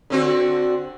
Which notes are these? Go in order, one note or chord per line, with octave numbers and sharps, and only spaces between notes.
D3 C4 F#4